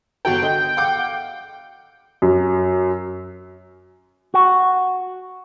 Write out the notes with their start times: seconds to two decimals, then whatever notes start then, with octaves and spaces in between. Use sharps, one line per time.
0.25 G1 F#4 A4 G5
0.42 D3 D#5
0.77 F5 F#5 D6
2.22 F#2
4.34 F#4